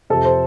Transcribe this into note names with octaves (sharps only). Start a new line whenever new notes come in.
F2 C3 A4
C5